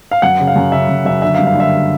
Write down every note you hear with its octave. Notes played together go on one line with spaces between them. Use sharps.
F5
F#2 F#5
C#3
F5
F#2
C#3 E5
F#2
F#2 E5
D3 E5
F5
G2
F5
D3 E5